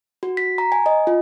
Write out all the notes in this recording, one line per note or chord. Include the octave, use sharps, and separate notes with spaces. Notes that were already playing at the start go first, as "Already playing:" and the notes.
F#4
B6
A#5
G#5
D#5
F4